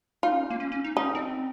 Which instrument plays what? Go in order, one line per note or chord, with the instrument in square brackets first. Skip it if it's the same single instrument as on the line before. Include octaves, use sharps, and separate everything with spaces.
[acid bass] D#4 [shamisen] F4
[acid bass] C#4
A#3
C#4
C#4
D#4
[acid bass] C#4 [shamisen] D#4
[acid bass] C4